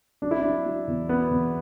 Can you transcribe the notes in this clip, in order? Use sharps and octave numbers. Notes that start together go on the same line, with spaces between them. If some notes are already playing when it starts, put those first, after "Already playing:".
F#3 D4
E4
F#3 D4
F#3
E2
F#3 B3
E2